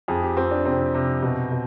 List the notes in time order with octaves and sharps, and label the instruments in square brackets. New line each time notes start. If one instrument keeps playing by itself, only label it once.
[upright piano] F2 G#4
G4
F2 C4
D4
C3 C4
C3
B2
B2